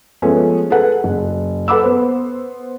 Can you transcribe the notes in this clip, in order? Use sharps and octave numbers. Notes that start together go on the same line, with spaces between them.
F3 G#3 A3 B3 C#4
G#4 A4 B4 F#5
F#1
A4 B4 F#5 B5 D6 E6
B3 C5